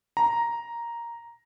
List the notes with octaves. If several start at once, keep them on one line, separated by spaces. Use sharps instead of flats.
A#5